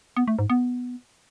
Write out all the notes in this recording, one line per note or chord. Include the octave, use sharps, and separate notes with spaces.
B3
A3
G#2
B3